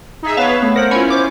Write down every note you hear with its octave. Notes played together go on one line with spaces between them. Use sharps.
D#4 G#4 E5
B3 B4 C#5 E5 F5 A5
A3 B3
A#4 C5 F#5
C#4 E4 F4 C#5 G#5 B5
C5 D6